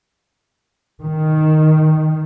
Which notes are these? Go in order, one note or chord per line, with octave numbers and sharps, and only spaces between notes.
D#3